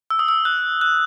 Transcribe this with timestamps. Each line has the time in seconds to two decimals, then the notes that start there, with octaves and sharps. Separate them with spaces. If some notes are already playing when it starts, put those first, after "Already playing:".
0.10 E6
0.19 D#6
0.28 E6
0.45 F#6
0.81 F#6